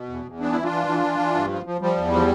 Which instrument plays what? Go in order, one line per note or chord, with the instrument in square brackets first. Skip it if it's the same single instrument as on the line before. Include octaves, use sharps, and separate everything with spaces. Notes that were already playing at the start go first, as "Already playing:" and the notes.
Already playing: [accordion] B2
E2
E2
E3 B3 D4
E3 E4
D4 F4
E3
E3
E3
E3
G2
F3
F3
F3 G3
E2
F3